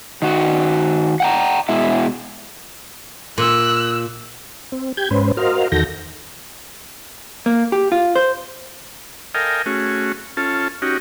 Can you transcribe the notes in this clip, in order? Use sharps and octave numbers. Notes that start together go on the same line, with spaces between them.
D#3 F#4
F#5 G5 A#5
B2 G#3 E4
A#2 E6 F#6
C4
G4 G6 G#6
G#2 C#4 B4 C5
F#4 A#4 C5 D#5 F5 F6
E2 D#3 F#4 A4 G6 A#6
A#3
G4
F4
C5
A4 A#4 D#5 F5 G5 G#5
A3 C#4 F#4 G#4
C#4 F4 A4 A5
C#4 D#4 F#4 G4